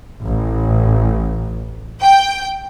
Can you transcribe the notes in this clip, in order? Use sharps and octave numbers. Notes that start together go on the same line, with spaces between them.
A1
G5